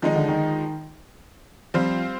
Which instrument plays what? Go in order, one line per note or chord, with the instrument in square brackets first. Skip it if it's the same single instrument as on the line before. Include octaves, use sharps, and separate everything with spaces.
[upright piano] D#3 [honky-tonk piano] F3 G#3 D#4
[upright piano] D3
D#3
[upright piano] F3 [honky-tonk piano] G3 C4 F4 C5